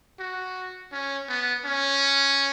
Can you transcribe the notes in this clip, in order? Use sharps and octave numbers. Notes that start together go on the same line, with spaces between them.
F#4
C#4
B3
C#4